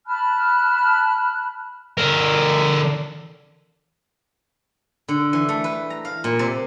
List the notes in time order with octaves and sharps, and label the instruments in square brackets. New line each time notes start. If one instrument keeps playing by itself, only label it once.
[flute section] A5 B5 F6 F#6
[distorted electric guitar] D3 A#4
[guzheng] D3
E3
A3
B4
A#5
F5
A#2
C3